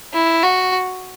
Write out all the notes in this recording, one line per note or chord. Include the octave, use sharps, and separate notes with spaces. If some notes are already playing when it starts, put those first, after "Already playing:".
E4
F#4